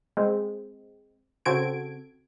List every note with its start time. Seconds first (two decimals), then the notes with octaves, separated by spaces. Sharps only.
0.17 G#3 C4
1.45 C#3 C4 F#4 A4 G#6 D7